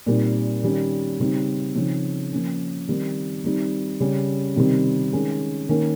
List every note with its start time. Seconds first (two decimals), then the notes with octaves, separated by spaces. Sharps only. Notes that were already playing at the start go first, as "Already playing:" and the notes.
0.06 A#2 G3 C4 D#4
0.63 D#3 G3 C#4
1.20 C#3 G3 C4 D#4
1.75 C#3 F3 C4 D#4
2.32 F3 A#3 C#4
2.89 D#3 G3 C4 D#4
3.44 D#3 G3 C4 D#4
4.00 C#3 G3 C#4
4.56 C3 D#3 G3 C4
5.13 D#3 G#3 C#4
5.69 D#3 A#3 C#4